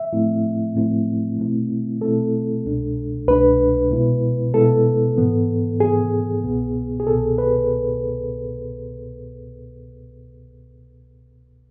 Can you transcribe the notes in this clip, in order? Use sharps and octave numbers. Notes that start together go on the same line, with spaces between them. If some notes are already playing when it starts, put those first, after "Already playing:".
Already playing: E5
A2 F3 A3 C4 E4
A2 F3 A3 C4 E4
B2 A3 C4 E4
B2 A3 C4 E4 A4
C2 B2 G#3 D4
C2 B2 G#3 D4 B4
B2 G#3 B3 E4
B2 G#3 B3 E4 A4
G#2 E3 B3
G#2 E3 B3 G#4
C2 B2 B3
G#4
C2 B2 B3 A4
B4